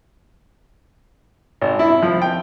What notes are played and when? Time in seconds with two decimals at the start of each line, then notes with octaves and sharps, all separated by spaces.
1.61 G#1
1.79 E4
2.02 F3
2.22 G5